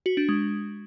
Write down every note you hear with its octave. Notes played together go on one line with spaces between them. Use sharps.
F#4
D4
G#3